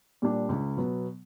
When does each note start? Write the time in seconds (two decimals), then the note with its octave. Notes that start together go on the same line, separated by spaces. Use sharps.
0.22 A#2 G3 A#3 D4
0.49 C#2
0.77 B2 F#3 B3